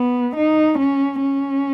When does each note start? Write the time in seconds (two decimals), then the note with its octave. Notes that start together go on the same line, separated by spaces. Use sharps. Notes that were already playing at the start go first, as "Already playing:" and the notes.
Already playing: B3
0.36 D#4
0.79 C#4
1.21 C#4